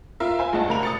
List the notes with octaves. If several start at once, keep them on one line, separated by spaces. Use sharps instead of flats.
F4 A#4 E5
C5 G#5
G2 G#3 F4 D#5 F#5 A5
D2 C3 A#4 B5 F7
D#6 A6 C#7